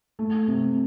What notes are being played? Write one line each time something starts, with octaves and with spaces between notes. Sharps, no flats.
A3
C3